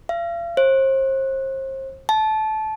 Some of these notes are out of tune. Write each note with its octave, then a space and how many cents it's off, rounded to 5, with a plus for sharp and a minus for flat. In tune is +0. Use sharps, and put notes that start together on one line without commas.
F5 -40
C5 +35
A5 -20